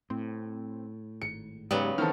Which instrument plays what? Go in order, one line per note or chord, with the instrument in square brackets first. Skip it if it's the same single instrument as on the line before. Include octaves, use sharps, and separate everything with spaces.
[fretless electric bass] A2 [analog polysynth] C4
[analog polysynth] G#1 [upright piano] C#7
[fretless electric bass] G#2 [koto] C#3 F#3 B3 [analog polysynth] G4 D5 G5
[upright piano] D#3 C4 A4 [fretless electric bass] E3 [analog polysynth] F6